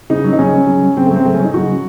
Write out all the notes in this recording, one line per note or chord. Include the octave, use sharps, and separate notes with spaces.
C#3 D#4
F#3
D#4
C#3 C#4
F#3
C#3
F#3
C#3 C4
A3
F#3
C4
C#3 A3
C#4
F#3 D#4
C#3 F#4
F#3